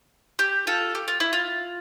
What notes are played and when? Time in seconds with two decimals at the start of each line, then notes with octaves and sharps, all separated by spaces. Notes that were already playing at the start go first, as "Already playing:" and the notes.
0.39 G4
0.67 F4 A4
0.95 G4
1.08 F4
1.20 E4
1.33 F4